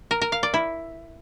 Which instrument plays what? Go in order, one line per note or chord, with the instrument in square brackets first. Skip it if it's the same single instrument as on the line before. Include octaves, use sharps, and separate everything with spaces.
[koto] A#4
A#4
F5
D5
E4